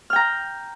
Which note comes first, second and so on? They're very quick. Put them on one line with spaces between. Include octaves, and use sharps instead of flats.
F6 G5 A#5